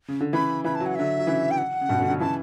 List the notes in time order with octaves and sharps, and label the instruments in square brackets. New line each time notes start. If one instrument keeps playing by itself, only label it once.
[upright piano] C#3
D3
[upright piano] C#3 E3 [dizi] B5
[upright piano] C#3 E3 [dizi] B5
[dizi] A5
[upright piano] F#3
[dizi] F#5
[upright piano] D3 F#3 [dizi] E5
[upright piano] F#3
C#3 E3
[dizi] G5
F#5
[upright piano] C#3
G2 B2
B2 D3
D3 F#3
[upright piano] C#3 E3 [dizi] A5